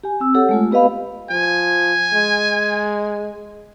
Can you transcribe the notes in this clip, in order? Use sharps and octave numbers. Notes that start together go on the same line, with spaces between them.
G4 G#5
C4 E6
G4 A4 C#5 F#5
G#3 A3 F4
B3 G4 B4 D#5 F5 B5
F3 G#5
G#3